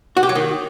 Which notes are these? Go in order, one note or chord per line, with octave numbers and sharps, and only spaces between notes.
F#4
G4
F#3
D#3